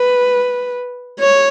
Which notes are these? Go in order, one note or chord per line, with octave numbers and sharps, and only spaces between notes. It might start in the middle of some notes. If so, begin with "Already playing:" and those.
Already playing: B4
C#5